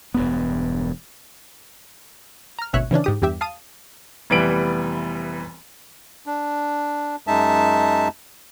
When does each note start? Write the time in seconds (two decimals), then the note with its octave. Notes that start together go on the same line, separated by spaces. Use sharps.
0.14 E1 G2 B3
2.59 A#5 F6
2.73 G#1 D2 B2 C#5 E5 F#6
2.91 C#3 E3 C#4 D4
3.04 G#2 G4 D#6
3.22 E2 G2 G4 E5
3.41 F5 A5 D#6 D#7
4.30 F1 E3 G3 B3 D7 F#7
6.26 D4
7.27 F#2 G#3 D#4 E5 A5